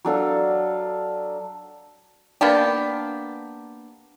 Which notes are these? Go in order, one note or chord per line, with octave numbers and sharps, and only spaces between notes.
F#3 D4 A4 F5
A#3 B3 D4 G4